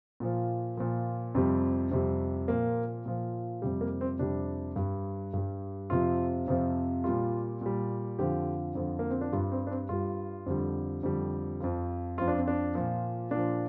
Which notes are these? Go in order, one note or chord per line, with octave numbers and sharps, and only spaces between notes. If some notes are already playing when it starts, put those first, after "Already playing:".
A#2 F3
A#2 F3
F2 C3 G3 C4
F2 C3 G3
A#2 F3 A#3
A#2 F3
F2 C3 G3
A#3
C4
F2 C3 G3 D4
G2 G3
G2 G3
F2 C3 F3 F4
F2 C3 F3
A#2 G3 F4
A#2 G3
F2 D3 F3 G4
F2 D3 F3
A#3
C4
D4
G2 G3 F4
C4
D4
C4
G2 G3 F4
F2 D3 G3
F2 D3 G3
F2 F3
F2 F3 F4
D4
C4
D4
A#2 F3
A#2 D4
F3